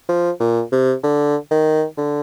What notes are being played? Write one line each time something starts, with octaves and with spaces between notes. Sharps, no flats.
F3
A#2
C3
D3
D#3
D3